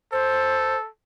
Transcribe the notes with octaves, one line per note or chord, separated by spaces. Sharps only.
A4 C5